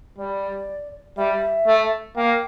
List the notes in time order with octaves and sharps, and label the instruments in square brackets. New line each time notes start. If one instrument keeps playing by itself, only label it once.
[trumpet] G3 [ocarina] D5
[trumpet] G3 [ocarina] E5
[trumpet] A3
[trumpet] A#3 [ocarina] G5